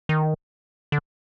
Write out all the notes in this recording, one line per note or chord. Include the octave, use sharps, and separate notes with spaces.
D#3
D3